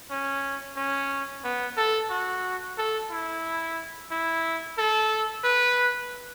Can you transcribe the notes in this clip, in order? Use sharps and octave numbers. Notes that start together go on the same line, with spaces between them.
C#4
C#4
B3
A4
F#4
A4
E4
E4
A4
B4